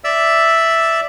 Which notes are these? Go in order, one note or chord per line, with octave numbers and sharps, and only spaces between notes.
D5 E5 E6